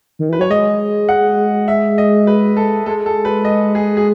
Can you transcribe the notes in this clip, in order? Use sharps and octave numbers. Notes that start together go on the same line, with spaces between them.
D#3
E3 B4
F#3 C#5
G#3 D#5
F#5
E5
D#5
B4
A4
G#3 A4
A4
B4
D#5
G#4
G#4